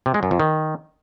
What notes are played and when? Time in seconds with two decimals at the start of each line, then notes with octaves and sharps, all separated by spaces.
0.06 C3
0.14 G#3
0.23 F#2
0.31 F2
0.40 D#3